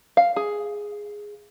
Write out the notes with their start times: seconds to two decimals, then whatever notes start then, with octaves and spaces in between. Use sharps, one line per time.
0.17 F5
0.36 G#4